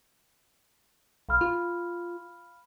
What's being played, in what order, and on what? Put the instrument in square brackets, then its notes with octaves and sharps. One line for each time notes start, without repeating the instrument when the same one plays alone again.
[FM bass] B1 [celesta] F5 B5 F6
[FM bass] F4